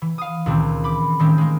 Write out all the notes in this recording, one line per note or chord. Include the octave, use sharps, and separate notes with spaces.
E3
F5 D#6
C#2 A#2 D#3 E3 C4
B5 D6
A2 D#3 G3 A#3 C4 C#4
G#3 A#3